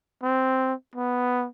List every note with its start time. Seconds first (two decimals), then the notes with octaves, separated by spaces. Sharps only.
0.23 C4
0.95 B3